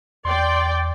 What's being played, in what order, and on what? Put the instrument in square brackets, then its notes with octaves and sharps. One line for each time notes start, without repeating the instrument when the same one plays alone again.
[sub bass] E2 [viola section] D5 G5 [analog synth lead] C6